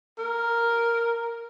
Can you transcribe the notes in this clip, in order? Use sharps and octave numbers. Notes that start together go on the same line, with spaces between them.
A#4